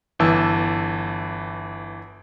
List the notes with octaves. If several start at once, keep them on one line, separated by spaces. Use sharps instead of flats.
G1 E3 A5 E6